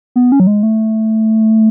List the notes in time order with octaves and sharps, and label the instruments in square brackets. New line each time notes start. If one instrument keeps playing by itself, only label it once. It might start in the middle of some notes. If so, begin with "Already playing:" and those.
[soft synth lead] B3
C#4
F#3
G#3
A3